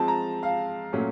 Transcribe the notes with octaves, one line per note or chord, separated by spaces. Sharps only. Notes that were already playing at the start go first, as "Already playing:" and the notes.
Already playing: F3 G#3 C4 A5
A#5
F5
A#2 F#3 A3 C#4